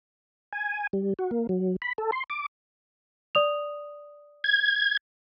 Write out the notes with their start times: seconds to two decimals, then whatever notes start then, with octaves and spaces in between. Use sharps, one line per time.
0.53 G#5
0.93 G3
1.19 F#4
1.31 A#3
1.49 F#3
1.82 B5
1.98 A4
2.12 C6
2.30 D6
3.35 D5 D#6 F7
4.44 G#6